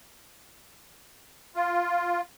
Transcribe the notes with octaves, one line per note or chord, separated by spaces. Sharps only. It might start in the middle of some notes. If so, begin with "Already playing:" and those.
F4